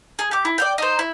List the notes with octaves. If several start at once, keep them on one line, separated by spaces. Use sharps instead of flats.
G#4
G4 D6
E4
D5 F5 G5
D#4 C5
E4